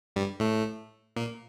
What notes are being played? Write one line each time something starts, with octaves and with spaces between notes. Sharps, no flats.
G2 G3
A2 A3
A#2 A#3